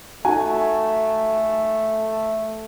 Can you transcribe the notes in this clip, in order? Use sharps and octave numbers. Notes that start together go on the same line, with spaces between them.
A3 D#4 F#4 G#5